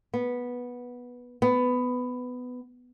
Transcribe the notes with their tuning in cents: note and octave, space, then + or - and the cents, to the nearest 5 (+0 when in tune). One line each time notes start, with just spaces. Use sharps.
B3 -10
B3 +15